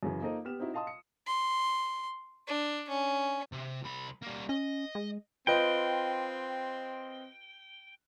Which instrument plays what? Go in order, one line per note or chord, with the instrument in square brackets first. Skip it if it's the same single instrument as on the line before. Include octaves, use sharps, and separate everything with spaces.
[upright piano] F#2 C#3 E3
A#3 D#4 F4 A4 C5 D#5
B3 G4 F6 E7
C4 D#4 E4 F#4
D#5 F5 A5 C6 D#6
C#7
[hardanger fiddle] C6
D4
C#4
[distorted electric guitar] C3
C2 B5
G3 A#3
[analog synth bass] C#4 [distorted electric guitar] D#5
[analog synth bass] G#3
[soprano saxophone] C4 [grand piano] F4 B4 D#5 [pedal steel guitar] G5